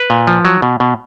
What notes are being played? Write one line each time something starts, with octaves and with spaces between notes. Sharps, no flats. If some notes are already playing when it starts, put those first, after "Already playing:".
Already playing: B4
A#2
F3
F#3
B2
B2